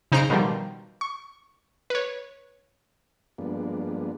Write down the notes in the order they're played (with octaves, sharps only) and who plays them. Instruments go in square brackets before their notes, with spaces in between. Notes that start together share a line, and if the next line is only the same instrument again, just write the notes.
[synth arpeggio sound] C#3 D#4 C5 A#5 C6 D7
B2 D#3 F3 G3
C#6
B4 C#5
[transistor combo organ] G2 F3 G#3 A#3 B3 D4